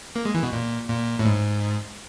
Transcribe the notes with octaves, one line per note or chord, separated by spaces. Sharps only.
A#3
G#3
E3
B2
A#2
A#2
A2
G#2